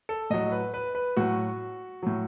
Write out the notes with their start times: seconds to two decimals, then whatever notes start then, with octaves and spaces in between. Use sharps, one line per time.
0.09 A4
0.30 A2 F#3 D#5
0.52 B4
0.74 B4
0.95 B4
1.17 A2 F#3 F#4
2.03 A2 F#3